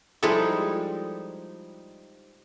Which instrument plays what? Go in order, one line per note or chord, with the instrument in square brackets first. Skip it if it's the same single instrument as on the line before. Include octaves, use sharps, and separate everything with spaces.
[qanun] F3 G3 D#4 [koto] G#3 E4 A4